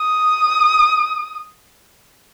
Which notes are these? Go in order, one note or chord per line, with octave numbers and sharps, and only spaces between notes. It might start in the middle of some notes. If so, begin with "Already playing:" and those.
Already playing: D#6